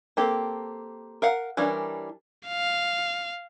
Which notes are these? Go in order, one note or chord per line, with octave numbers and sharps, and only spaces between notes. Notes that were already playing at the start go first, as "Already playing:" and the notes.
A#3 C4 G4 A4
A#4 F5 F#5
E3 G3 C#4 D4 A#4
F5